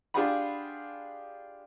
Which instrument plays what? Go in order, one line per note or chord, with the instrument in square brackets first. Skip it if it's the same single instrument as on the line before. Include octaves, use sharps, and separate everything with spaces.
[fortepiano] D4 F4 G4 G#4 F#5 B5